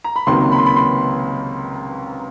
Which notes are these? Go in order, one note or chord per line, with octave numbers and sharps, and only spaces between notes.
A#5
B5
C#2 C3 D#3 F#3 A#3 C6
B5
C6
B5
C6